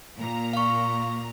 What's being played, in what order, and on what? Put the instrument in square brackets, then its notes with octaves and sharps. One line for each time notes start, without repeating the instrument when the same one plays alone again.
[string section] A#2 A#5
[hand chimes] F5 C#6